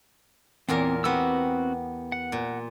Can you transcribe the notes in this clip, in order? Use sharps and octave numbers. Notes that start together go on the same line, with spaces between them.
E2 A#2 C4 A#4
B3 C4 F#4 G4 A#4 E6
F#5
A#2